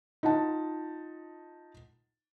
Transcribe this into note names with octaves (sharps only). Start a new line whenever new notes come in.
D#4 F4 F#5 A5